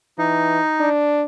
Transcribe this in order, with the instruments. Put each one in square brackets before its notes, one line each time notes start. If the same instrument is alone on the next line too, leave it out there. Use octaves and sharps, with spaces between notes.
[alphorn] E3 [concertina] D#4
[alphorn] D4